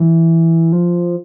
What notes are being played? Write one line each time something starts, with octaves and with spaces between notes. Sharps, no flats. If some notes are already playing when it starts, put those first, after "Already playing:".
Already playing: E3
F3